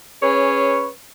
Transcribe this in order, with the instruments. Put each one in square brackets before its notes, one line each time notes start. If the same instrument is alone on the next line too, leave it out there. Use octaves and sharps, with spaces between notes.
[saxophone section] C#4 G#4 B4 C#5